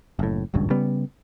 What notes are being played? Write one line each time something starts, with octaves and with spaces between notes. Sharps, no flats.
F#1 A2
D#1 G#1 C#2 G2
C#3 G3 B3